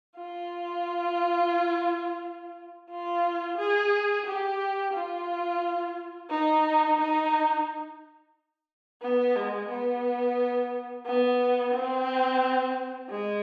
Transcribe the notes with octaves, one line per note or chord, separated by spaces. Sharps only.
F4
F4
G#4
G4
F4
D#4
D#4
B3
G#3
B3
B3
C4
G#3